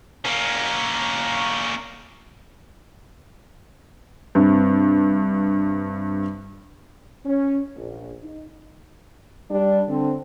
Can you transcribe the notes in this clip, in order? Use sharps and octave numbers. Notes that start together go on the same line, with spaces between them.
A#3 C#4
G2 C3
C#4
A#1
D#4
G3 D4
D3 C4